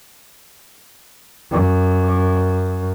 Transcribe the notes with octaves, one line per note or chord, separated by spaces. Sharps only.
F#2